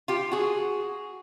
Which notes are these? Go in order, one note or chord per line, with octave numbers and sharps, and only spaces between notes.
F4 G4
F#4 G#4